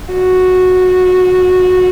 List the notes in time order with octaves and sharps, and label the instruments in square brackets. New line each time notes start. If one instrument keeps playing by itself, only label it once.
[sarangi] F#4